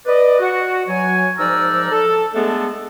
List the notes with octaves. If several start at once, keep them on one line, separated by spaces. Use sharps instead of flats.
B4 D5 D#5
F#4
F#3 C#5 G#5
G#2 F3 D#4 A#4 D5 E6
A4
G#3 A3 B3 D4 A4